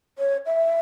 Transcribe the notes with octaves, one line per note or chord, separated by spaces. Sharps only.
C#5
E5